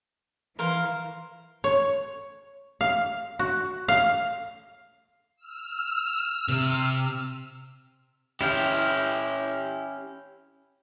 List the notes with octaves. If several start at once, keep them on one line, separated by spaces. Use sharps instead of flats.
E3 A#4 C5 F5
C#5
F5
F#4
F5
E6 F6
C3
C#4 E4 G4 F5 G5